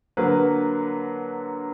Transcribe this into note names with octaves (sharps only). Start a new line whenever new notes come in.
D3 F#3 A#3 B4